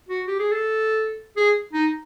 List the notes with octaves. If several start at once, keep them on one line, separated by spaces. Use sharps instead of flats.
F#4
G4
G#4
A4
G#4
D#4